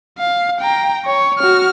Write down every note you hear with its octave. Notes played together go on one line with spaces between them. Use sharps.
F5
G5 A#5
C#5
F#4 F6